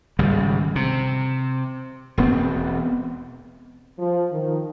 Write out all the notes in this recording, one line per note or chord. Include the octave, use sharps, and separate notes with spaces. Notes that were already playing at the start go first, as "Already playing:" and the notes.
G#1 C#3 G3
C3
E1 B3 C4
F3
D#3